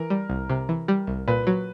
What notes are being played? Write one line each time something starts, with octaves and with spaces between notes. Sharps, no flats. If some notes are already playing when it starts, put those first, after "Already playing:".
Already playing: E3 A#4
G3
C2
C3
E3
G3
C2
A#2 B4
F#3